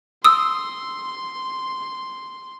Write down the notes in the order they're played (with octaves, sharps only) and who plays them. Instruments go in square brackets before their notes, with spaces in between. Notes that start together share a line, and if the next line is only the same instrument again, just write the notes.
[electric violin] C6 [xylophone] D#6 E6